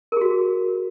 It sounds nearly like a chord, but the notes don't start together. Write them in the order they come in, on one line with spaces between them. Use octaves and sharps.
A#4 G#4 F#4